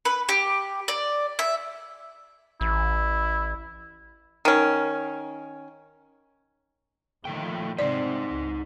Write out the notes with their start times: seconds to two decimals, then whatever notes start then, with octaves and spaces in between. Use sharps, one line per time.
0.05 B4
0.29 G4
0.88 D5
1.39 E5
2.61 A1 E4
4.45 D#3 C#4
7.25 A#2 D#3 F3 A3 G5
7.79 G#2 C3 D#4 C5 D5
8.30 C#2